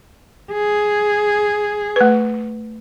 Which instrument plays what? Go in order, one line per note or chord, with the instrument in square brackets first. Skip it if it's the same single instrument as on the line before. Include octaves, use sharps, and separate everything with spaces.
[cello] G#4
[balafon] A3 B4